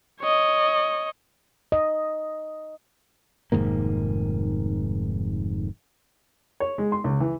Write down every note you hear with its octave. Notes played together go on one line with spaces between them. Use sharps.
C#5 D#5
D#5
F1 G#2 D#3 A#3
C#5
G#3
C6
C#2
E3